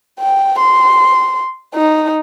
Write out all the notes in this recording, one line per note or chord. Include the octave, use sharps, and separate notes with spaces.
G5
C6
D#4